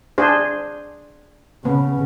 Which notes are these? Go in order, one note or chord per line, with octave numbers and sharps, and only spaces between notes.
D4 G#4 C5
C#3 B3